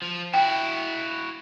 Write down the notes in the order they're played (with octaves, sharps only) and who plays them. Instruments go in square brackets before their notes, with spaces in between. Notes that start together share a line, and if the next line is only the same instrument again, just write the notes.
[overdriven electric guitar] F3
[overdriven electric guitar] E4 F#4 [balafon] G5